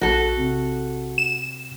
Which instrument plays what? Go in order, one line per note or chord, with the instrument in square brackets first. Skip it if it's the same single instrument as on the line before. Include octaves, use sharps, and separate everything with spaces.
[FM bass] A#1 [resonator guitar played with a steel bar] F#4 A4
[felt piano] C3
[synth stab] E7